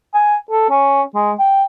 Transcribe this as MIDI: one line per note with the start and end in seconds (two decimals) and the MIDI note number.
0.14 0.36 80
0.51 0.66 69
0.70 1.02 61
1.15 1.32 56
1.39 1.64 79